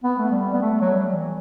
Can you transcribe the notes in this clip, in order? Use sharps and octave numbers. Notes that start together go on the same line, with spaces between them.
B3
A3
G3
B3
A3
F#3
G3
E3